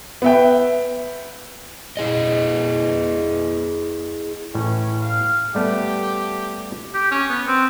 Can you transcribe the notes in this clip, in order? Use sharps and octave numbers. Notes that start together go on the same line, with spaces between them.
B3 E5 G5
E4 G#4 D#5
A2 E3 C#4
F5
G3 A3 B3 G4
G4
C#4
B3
C4